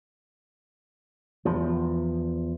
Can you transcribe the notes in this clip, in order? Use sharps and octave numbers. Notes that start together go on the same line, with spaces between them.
E2 F3